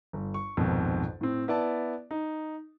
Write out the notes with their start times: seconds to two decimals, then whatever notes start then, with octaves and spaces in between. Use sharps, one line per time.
0.13 G1
0.34 C#6
0.57 A#1 F2 G#2 B2 D#3
1.21 A2 C4
1.48 B3 E4 D5 A5
2.11 D#4